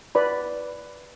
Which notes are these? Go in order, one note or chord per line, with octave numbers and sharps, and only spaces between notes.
B4 D5 B5